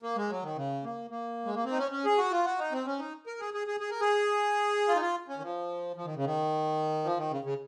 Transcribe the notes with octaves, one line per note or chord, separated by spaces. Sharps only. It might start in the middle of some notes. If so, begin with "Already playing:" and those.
A#3
G#3
F#3
D#3
C#3
A#3
A#3
G#3
A#3
C4
D#4
C#4
C#4
G#4
F#4
F4
F#4
D#4
C4
C#4
D#4
A#4
G#4
G#4
G#4
G#4
A#4
G#4
F4
D#4
F4
C#4
D#3
F3
F3
D#3
C#3
D#3
F3
D#3
C#3
C#3